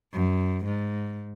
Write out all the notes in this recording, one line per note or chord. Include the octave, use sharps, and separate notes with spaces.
F#2
G#2